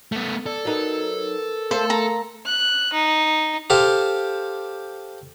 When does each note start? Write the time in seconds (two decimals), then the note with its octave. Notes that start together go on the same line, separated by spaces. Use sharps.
0.12 A3 B3
0.46 A4 D5
0.65 F#3 D#4 A#4 B4
1.71 A3 A4 A#4 C5 F5 C6
1.90 A#5
2.46 F#6
2.93 D#4
3.70 G4 A4 C5 F5